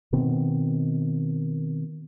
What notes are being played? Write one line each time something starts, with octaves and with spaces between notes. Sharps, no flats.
B2 D#3 B3 C4